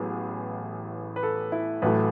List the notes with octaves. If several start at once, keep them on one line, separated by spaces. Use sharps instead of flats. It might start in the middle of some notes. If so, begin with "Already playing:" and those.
Already playing: A1 A2 F#3 B3 G#4
B4
A4
E4
A1 A2 F#3 A3 B4